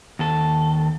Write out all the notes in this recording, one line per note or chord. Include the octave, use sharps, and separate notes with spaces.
D#2 A4